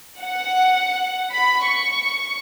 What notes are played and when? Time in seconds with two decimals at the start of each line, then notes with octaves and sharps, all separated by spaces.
0.21 F#5
1.32 B5
1.65 C#6